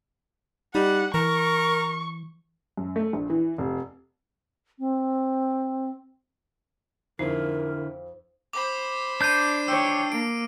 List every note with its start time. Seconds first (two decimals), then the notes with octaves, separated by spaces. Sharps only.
0.75 G3 D#4 F#5
1.14 E3 A#4 C#6
2.77 F#2
2.96 A3
3.13 A#1
3.30 E3
3.58 F1
4.79 C4
7.19 F2 D3 D#4 E4 A#4
8.53 C5 B5 D6
9.21 D4 G6 C7 D#7
9.68 C#5 G5 E6
10.12 A#3 D7